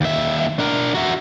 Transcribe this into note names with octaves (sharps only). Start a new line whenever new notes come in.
D#2 E5
D4 A#4
F#4 E5